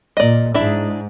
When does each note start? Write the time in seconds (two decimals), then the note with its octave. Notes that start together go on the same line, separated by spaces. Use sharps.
0.17 A#2 D5 D#5
0.54 G#2 D4 E4 E5